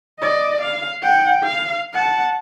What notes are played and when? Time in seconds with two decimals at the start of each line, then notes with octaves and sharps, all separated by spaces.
0.20 D5 D#5
0.62 F5
1.03 F#5 G5
1.44 F5
1.94 F#5 A5